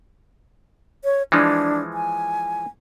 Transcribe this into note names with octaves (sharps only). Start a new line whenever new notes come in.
C#5
E3 F3 G#3 D4
G#5